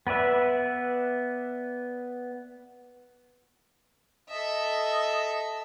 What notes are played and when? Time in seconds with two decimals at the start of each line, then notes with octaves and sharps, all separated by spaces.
0.07 B3 B4 D5 E5
4.30 A4 D#5 E5